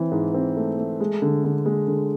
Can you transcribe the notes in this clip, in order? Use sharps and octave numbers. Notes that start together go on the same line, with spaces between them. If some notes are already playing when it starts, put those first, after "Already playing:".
Already playing: E3 C4
G#2
C4
A3
A3
G#3
D3
D3
G#3
D3